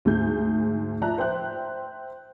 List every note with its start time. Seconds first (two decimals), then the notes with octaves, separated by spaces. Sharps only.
0.05 D2 G#2 G#4 G6
1.01 F3 D5 E5 A5 A#5 F#6
1.18 C5 E5 G5 F#6